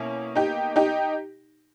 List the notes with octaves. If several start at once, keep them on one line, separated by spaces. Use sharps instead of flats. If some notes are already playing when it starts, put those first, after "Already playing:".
Already playing: B2 A#3 C#4 E4
D#4 G4
D#4 G4